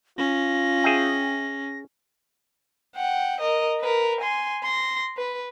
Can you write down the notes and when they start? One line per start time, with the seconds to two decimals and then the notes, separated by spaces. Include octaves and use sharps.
0.18 C#4 F4 A#6
0.84 G#4 E5 G5
2.95 F#5 G5
3.41 A#4 D#5
3.81 A#4 B4
4.20 G#5 C6
4.63 C6 A#6
5.17 B4